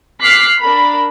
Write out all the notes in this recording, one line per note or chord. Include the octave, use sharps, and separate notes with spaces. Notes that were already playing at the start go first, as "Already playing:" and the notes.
D6 F6 F#6 B6 C7
D4 A#4 B5